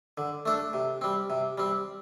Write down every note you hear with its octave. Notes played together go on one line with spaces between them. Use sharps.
D3
A3 D4 A4
C3
G3 C4
C3
G3 C4